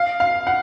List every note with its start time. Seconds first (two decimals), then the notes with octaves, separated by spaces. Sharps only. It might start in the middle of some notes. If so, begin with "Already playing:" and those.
Already playing: F5
0.20 F5
0.47 F#5